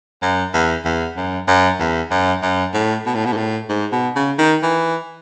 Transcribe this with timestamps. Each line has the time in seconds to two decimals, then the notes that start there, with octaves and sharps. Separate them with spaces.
0.22 F#2
0.54 E2
0.85 E2
1.17 F#2
1.47 F#2
1.80 E2
2.11 F#2
2.42 F#2
2.74 A2
3.06 B2
3.15 A2
3.25 B2
3.33 G#2
3.37 A2
3.69 G#2
3.92 B2
4.16 C#3
4.39 D#3
4.63 E3